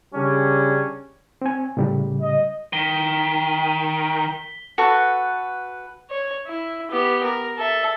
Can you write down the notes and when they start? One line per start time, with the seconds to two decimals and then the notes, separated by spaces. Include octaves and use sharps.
0.14 C#3 G3 C#4 D4
1.42 C4 G#5
1.77 A2 C#3 G3
2.21 D#5
2.73 D#3 B6 G7
4.78 F#4 A4 B4 C#6
6.10 C#5
6.47 E4
6.91 B3 G4
7.23 A#4
7.58 A4 E5